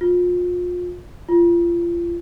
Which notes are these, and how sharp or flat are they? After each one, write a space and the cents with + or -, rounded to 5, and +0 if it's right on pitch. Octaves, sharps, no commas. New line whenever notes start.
F4 +30
F4 -30